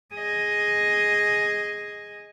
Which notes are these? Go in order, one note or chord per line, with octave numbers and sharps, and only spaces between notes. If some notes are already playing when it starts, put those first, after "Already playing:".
G#4 D#5